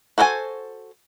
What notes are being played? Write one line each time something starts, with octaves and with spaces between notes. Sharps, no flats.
F#4 A4 C5 D5 G#5